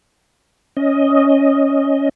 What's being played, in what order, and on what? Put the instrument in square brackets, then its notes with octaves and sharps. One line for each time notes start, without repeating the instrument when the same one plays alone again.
[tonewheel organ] C#4 D#5